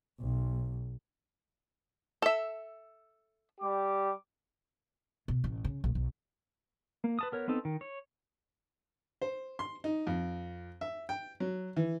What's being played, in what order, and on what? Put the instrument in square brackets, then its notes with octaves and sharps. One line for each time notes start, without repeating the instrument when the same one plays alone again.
[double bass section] B1
[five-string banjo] A4 E5
[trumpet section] G3 G4 D6
[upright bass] B2
A1
C#3
A#1
B1
[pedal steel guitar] A#3
B4 A5 D#6
B3 A#4 C#5
B3 C4 D#4 A4
D#3
C#5
[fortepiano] C5
C6
D#4
F2
E5
G5
F#3
E3